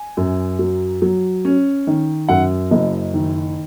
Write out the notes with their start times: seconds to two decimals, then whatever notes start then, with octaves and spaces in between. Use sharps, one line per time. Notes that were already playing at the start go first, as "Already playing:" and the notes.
Already playing: G#5
0.17 F#2
0.59 F#3
1.02 F#3
1.45 C#4
1.87 D#3
2.28 F#2 F#5
2.71 F#1 D#5
3.14 D#3